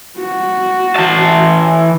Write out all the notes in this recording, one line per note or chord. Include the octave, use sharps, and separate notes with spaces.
F#4
E3 A5